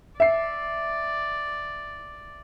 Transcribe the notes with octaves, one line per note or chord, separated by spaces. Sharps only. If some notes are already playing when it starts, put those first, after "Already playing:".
D5 E5 C7